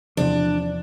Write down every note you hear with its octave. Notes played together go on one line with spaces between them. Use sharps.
E2 C3 F3 D4